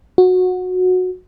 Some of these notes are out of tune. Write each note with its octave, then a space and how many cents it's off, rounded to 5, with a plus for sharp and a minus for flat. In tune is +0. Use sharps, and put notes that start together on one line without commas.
F#4 -15